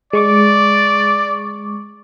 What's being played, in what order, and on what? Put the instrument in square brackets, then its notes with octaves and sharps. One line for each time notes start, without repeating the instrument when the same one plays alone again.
[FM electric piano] G#3 C#6 D6 [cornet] D5